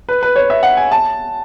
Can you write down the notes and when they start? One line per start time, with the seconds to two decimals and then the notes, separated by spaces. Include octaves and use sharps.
0.09 B4
0.23 B4
0.36 C#5
0.50 E5
0.63 F#5
0.77 G#5
0.92 A5